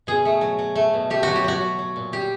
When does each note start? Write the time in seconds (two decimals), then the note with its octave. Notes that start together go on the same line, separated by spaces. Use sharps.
0.07 B2 G#4
0.25 A3
0.41 F#3
0.59 F#3
0.75 A3
0.94 B2
1.10 A3 G4
1.23 F#3 F#4
1.36 G4
1.44 F#3 F#4
1.61 F#3
1.79 F#3
1.96 A#2
2.13 G3 G4